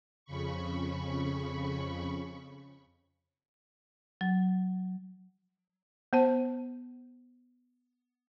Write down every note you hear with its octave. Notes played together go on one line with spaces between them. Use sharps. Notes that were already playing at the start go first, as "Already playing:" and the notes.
F2 C#3 B5 C#6
F#3
B3 C5 A5